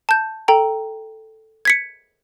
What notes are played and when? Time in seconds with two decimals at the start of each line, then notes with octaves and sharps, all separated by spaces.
0.09 A5 G6
0.48 A4 G5 A#5
1.65 G#6 B6 C#7